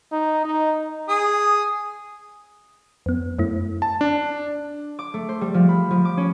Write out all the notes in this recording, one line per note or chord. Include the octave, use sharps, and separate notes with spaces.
D#4
D#4
G#4 D#6
F2 B3
F#2 A3 E4
A5
D4
D6
A3
C5
G3
F3
B5
F3
D6
C#4